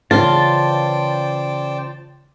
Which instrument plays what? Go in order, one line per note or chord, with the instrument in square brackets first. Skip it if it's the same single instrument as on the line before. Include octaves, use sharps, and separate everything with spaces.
[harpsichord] C#3 E3 B4 [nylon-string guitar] F4 [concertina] C5 D5 G5 [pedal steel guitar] A5